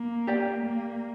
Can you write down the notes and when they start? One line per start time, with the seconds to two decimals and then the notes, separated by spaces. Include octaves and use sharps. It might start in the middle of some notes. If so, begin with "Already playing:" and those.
Already playing: A#3
0.27 G4 D5 G5
0.66 A#3